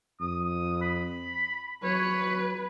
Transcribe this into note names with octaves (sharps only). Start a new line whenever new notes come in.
F2 D#6
B5
F#3 B4 C#5